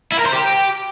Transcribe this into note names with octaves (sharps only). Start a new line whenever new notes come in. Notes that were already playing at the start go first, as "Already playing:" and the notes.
E4
A#4
C5
G4